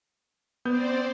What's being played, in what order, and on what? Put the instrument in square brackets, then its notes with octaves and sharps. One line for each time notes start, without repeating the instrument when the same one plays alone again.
[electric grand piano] B3 G6 [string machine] C4 C5 D5